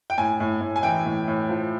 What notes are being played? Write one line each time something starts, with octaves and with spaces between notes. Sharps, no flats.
G5
A2 G#5
A2
A2
G#5
E3 G5
A2
A2
F3